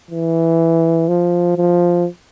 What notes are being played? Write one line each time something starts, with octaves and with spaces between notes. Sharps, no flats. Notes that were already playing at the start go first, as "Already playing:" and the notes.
E3
F3
F3